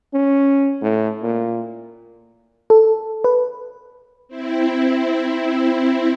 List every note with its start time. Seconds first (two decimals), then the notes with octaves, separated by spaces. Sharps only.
0.14 C#4
0.82 A2
1.22 A#2
2.70 A4
3.24 B4
4.28 C4 E4